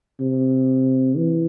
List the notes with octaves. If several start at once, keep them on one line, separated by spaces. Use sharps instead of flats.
C3
E3